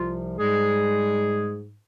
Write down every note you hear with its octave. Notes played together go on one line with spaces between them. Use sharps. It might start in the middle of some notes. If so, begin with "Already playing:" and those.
Already playing: C2 C3 F3 F4
G#2 G3 G#3 G#4